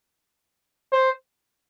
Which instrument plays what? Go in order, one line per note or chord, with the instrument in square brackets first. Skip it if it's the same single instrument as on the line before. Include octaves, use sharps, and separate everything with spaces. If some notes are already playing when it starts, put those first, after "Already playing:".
[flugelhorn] C5